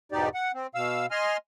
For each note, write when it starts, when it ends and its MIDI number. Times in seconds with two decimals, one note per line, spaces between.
0.12 0.29 40
0.12 0.29 44
0.12 0.29 47
0.12 0.29 63
0.12 0.29 67
0.12 0.29 74
0.34 0.52 78
0.54 0.67 60
0.75 1.06 47
0.75 1.06 77
0.75 1.06 88
1.11 1.37 75
1.11 1.37 80
1.11 1.37 84
1.11 1.37 89